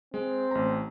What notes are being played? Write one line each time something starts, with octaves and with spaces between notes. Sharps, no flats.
G#3 C4
A1 A#5